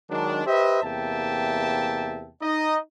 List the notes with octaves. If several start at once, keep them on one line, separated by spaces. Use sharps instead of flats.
D#3 F#3 G#3 D4
G4 B4 C5 D#5 E5
E2 C3 A#3 E5 G5 A5
D#4 D#5